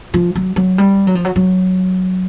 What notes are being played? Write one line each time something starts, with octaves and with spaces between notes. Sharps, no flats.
F3
F#3
F#3
G3
F#3
F3
F#3
F#3